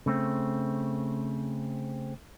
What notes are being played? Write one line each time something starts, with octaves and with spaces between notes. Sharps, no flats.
C#3 A3 C4